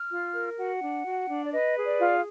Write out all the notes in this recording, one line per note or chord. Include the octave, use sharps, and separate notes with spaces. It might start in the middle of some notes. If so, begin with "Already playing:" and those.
Already playing: F6
F4
A#4
F#4 F#5
D4
F#4
D4
D5
B4 D#5
G#4
D5
F4